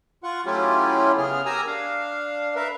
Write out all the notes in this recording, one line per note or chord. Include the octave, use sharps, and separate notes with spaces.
F4 F#5 C#6
F#3 A3 C#4 E4 F4 G4
C#3 B3 G#4 F6
G4 A#4 G#5 A#5 D#6 E6
D4 F5
A#4 B4 E5 F5